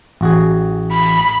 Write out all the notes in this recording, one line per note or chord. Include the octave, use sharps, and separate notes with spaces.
A1 F#4 G#4
B5